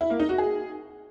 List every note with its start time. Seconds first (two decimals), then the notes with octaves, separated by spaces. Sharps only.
0.01 E4
0.10 A#3
0.20 D#4
0.29 F#4
0.38 G#4